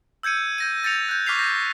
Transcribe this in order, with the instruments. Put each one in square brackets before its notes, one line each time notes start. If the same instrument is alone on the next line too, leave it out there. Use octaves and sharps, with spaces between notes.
[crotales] E6 G6 G#6 C#7 D#7
G6 A#6 D#7
G6 A6 A#6 C#7 F7
F#6 G6
C#6 D6 F6 B6 C7 F7
G6 A#6